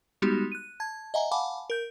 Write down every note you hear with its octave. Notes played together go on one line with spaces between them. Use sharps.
G3 G#3 B3 D#4 F#4 G4
F#6 D#7
A5 G#6
D#5 E5 F#5 G#5 A#5
F5 F#5 G#5 A5 B5 D6
A#4 G6